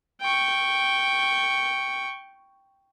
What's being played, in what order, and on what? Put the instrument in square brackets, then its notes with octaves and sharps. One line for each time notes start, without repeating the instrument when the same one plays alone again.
[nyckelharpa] G5 C#6